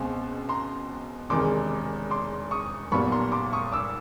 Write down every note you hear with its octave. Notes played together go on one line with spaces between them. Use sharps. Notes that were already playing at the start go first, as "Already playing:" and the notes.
Already playing: C#2 B2 G#3 C4
A#5 C6
E1 E2 C3 D#3 G#3 C6 D6
C6 D6
C#6 D#6
B1 A#2 G3 B3 B5 C#6
A#5 C6
C6 D6
C#6 D#6
D6 E6